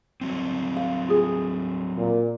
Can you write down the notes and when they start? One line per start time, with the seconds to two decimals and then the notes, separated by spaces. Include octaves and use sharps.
0.21 F#3 G3 C4
0.76 F5
1.09 F4 G#4
1.98 A#2